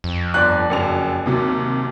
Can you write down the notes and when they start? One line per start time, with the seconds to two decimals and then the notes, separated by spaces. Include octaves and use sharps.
0.04 F2
0.34 G1 D5 F#6
0.70 F#1 F#2 F7
1.26 D#2 C3 F#3